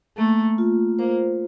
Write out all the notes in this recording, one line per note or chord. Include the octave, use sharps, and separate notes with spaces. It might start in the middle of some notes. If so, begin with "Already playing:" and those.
A3 A#3
F4
A#3 C5